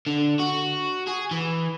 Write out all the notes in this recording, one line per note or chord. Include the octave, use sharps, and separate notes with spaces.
D3
F#4
G#4
E3